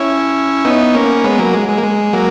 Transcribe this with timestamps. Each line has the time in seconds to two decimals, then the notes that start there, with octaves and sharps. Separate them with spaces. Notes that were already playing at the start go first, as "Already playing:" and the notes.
Already playing: C#4 E4
0.65 B3 D#4
0.95 A#3 C#4
1.24 G#3 B3
1.39 F#3 A#3
1.54 G#3
1.69 G#3
1.78 A#3
1.83 G#3
2.13 F#3 A#3